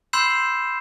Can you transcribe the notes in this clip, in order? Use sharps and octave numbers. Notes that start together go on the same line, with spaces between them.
B5 C6 E6 G6 C7 E7